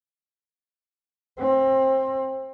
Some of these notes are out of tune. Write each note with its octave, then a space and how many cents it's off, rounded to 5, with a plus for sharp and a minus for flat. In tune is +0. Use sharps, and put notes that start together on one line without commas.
C4 +25